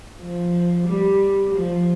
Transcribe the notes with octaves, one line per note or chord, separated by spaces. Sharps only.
F3
G3
F3